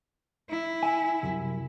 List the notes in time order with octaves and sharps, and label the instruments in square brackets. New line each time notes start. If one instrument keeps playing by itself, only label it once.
[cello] E4
[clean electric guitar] G#5
C2 F#2